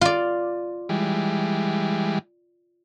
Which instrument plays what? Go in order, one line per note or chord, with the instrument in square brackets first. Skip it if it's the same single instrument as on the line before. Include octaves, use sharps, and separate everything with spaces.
[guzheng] F4 D5
[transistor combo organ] E3 G3 G#3